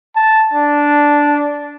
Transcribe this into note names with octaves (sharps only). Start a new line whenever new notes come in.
A5
D4